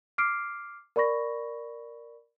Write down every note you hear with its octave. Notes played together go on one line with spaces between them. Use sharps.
D6 F6 C7 D7
A#4 D5 B5 C#6 A#6